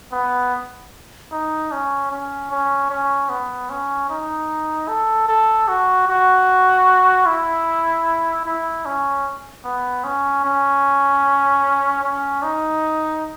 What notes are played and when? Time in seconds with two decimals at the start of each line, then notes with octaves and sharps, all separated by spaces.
0.12 B3
1.32 D#4
1.72 C#4
2.11 C#4
2.51 C#4
2.90 C#4
3.29 B3
3.70 C#4
4.10 D#4
4.88 A4
5.28 A4
5.68 F#4
6.08 F#4
7.26 E4
8.46 E4
8.86 C#4
9.64 B3
10.04 C#4
10.45 C#4
12.03 C#4
12.43 D#4